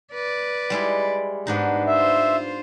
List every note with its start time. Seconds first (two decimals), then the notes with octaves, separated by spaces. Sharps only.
0.13 B4 D5
0.70 G3 G#3 E4
1.47 G#2 B3 D4 D#4
1.87 F4 C5 E5